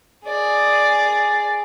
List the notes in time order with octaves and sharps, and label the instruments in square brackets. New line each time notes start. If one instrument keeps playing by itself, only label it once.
[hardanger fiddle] G#4 D5